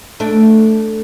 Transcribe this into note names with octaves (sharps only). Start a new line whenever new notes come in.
A3 D4